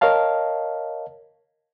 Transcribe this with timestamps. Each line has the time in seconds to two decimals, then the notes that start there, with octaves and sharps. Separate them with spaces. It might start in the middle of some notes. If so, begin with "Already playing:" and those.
0.01 A#4 C#5 D#5 F5 A5